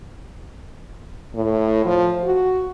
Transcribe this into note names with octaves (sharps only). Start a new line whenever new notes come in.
A2
F3
F#4